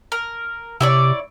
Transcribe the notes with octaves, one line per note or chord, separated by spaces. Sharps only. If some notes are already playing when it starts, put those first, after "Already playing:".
A#4
C3 E4 C#5 D5